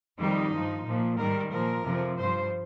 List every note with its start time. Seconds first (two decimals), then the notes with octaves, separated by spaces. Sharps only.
0.19 F2 D#3 G3 D#4
0.53 G2 F3
0.86 A#2 F3
1.18 G#2 D#3 G3 A#4
1.51 A#2 F3 A#4
1.84 F2 C3 F3
2.18 G2 F3 C5